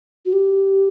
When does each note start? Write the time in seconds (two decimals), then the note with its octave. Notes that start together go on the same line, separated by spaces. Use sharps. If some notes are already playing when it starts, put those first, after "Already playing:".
0.26 F#4
0.33 G4